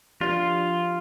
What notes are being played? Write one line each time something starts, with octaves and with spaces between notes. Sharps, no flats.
F3 D4 F4 G4 D5